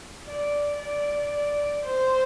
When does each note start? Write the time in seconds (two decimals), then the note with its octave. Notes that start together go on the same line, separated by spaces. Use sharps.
0.26 D5
0.78 D5
1.83 C5